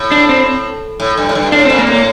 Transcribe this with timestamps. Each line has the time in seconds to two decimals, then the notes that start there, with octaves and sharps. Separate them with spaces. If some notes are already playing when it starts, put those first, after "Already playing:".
Already playing: A2
0.12 D4
0.29 C4
1.00 A2
1.17 G2
1.29 A2
1.35 G2
1.52 A2 D4
1.65 C4
1.70 A#2
1.79 A#3
1.87 A2
1.92 A#3